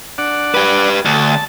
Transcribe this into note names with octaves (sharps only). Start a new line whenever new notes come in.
D4 D5 F#5
G4 B4
D2 A5